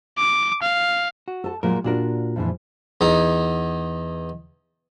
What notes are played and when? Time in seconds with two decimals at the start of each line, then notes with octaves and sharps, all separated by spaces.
0.18 D6
0.63 F5
1.28 F#4
1.44 A4 A5
1.63 A#2 F#3 G#3 A#4
1.84 A#2 D4 F4 F#4 A#4
2.36 F2 G#2 E3
3.01 E2 D#4 D#6